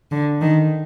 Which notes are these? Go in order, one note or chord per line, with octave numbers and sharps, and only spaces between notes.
D3
D#3